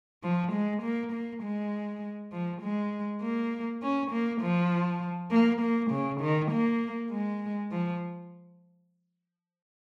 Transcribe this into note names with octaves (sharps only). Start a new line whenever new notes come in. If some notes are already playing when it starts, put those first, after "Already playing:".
F3
G#3
A#3
A#3
G#3
F3
G#3
A#3
C#4
A#3
F3
A#3
A#3
C#3
D#3
A#3
G#3
F3